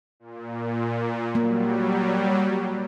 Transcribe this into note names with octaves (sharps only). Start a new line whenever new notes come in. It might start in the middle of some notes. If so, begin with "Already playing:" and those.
A#2
F#3 G3 A#3